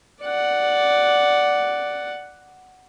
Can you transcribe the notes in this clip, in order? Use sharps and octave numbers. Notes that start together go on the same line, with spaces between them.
D5 F#5